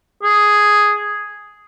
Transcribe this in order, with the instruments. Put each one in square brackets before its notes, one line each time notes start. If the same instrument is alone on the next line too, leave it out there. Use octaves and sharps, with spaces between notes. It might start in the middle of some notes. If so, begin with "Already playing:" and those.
[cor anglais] G#4